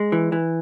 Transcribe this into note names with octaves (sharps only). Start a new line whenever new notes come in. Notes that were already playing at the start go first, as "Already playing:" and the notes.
Already playing: G#3
E3
E3